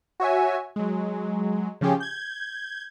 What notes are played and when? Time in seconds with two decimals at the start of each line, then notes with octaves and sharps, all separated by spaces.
0.20 F#4 C#5 E5 G#5
0.76 F#3 G#3
1.81 C#3 F3 C#4 G4 G#4
2.00 G6 G#6